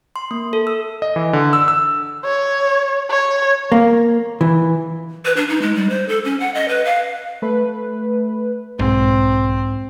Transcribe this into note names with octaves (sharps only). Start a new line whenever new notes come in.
C6
A#3
A4
E6
D#5
E3
D3
E6
E6
C#5
C#5
A#3
E3
B4
D4
D#4
G#3
G3
C5
A4
C#4
F#5
D#5
B4
F5
A3 B4
B1 G#2 C4